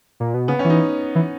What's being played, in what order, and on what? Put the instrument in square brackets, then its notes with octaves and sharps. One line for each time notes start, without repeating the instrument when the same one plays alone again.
[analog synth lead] A#2
B2
[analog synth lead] C#3 [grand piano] B3
[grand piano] C#4
[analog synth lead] E3
[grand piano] D#4
[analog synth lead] E3